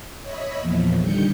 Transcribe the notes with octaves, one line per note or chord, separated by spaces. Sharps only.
C#5 D#5 E5 B5
E2 A#2 F3
D3 D#3 G3 G6 C#7